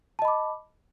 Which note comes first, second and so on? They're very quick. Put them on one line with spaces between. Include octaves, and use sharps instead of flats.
A5 D#5 B5 D6